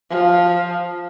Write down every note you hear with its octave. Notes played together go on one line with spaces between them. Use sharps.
F3